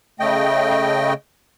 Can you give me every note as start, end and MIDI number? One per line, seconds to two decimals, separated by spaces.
0.20 1.13 49
0.20 1.13 57
0.20 1.13 75
0.20 1.13 79